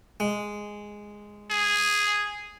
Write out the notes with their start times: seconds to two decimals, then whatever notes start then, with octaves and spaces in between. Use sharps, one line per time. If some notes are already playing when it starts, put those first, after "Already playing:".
0.20 G#3
1.51 G#4